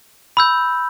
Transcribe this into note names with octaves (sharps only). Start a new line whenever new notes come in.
B5 E6 G6